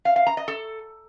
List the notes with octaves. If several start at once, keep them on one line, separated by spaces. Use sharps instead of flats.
F5
F5
A#5
D#5
A4